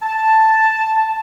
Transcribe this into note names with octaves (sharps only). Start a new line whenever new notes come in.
A5